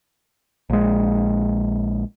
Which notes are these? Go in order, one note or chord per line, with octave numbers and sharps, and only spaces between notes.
A#1 G#3